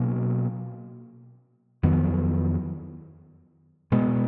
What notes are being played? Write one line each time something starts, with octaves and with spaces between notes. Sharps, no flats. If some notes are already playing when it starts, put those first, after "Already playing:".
Already playing: B2 F#3 A#3 C#4
F2 D#3 F#3 B3
B2 G#3 B3